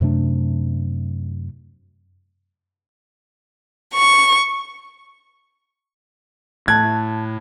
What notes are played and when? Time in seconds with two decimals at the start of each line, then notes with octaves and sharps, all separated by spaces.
0.01 F#2 C3 A3 D4
3.94 C#6
6.68 A2 A5 F#6 G#6